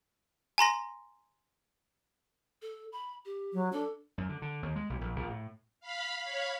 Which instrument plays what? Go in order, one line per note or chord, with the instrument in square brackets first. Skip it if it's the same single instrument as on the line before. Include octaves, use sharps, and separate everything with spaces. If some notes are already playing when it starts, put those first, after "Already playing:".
[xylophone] G#5 A#5 C6 A#6
[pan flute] A4
B5
G4
[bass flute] F#3
[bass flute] D4 [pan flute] A4
[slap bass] F#2
D3
D3
D#2
G#3
B1
A#1
A#1
A2
[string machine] F5 B5
C#5 F5 B5